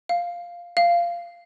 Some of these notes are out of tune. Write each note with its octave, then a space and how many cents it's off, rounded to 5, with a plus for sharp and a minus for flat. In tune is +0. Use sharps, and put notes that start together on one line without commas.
F5 +0
F5 -15